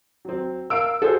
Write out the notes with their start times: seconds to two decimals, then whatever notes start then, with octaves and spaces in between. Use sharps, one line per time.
0.25 F#3 C4
0.70 A#4 F5 E6 D7
1.02 F#4 G#4 A4 C5